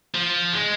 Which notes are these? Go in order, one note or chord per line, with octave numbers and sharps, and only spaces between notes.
F3
G#3